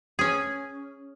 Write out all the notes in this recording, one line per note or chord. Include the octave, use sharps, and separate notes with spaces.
C#4 G#4